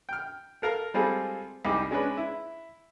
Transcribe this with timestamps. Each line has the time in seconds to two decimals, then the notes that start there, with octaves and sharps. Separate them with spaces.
0.09 G5 F6
0.62 A4 A#4 F5 A#5
0.94 G3 G#3 C4 F4 G#4 A4
1.65 C2 G3 D#4 G#4 D6
1.91 G#3 C#4 D4 B4
2.17 E4